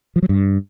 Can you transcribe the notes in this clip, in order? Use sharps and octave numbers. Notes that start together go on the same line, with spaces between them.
F3
F#3
G2